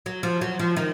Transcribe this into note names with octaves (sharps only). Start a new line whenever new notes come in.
F#3
F3
F#3
F3
D#3